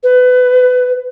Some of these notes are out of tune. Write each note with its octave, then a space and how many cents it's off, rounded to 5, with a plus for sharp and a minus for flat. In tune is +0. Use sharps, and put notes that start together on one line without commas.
B4 +25